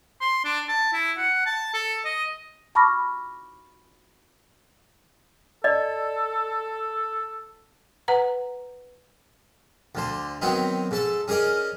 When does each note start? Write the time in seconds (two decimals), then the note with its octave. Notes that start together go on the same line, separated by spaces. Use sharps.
0.21 C6
0.45 D4
0.69 A5
0.93 E4
1.18 F#5
1.46 A5
1.74 A4
2.05 D#5
2.75 A5 B5 C#6 D6 F6 A#6
5.64 A4 D5 D#5
8.08 B4 F#5 A#5
9.95 D2 D3 C5
10.42 D#3 F#3 B3 C4 D#4
10.91 G#2 A4 A5
11.28 C#4 G#4 A#4 D5 D#5